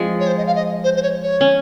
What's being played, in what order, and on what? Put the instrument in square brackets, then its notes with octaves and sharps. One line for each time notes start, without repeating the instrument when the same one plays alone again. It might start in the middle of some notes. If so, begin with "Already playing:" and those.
Already playing: [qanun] F3 G#3 C4
[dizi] C#5
C5
D#5
F5
D#5
C5
C5
C#5
C#5
[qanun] C#4